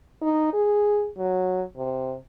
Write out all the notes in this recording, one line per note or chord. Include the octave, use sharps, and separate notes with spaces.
D#4
G#4
F#3
C3